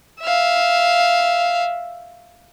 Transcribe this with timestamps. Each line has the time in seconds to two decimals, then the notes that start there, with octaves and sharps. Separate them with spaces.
0.21 E5 F5